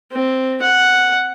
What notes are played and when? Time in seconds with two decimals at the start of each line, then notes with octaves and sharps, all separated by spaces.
0.12 C4
0.62 F#5